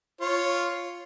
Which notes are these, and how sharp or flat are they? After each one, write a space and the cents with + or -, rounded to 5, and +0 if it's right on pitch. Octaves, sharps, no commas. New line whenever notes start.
F4 +0 C#5 +0